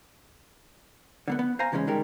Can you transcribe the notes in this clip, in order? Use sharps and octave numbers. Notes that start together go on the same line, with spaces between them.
D3 A#3 B3
B3
C5 F5 G#5 A#5
C#3 E3 G3 G#3 C#4
D#3 G3 G#3 G4 A#4